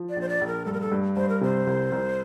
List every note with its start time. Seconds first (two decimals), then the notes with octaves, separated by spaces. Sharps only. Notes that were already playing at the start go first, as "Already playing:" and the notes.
Already playing: F3
0.10 D5
0.16 A#1
0.21 C5
0.29 D5
0.41 A#1
0.47 A#4
0.66 G2 A4
0.73 A#4
0.81 A4
0.92 G2
1.17 G2 C5
1.29 A#4
1.41 C3 C5
1.67 C2
1.92 C2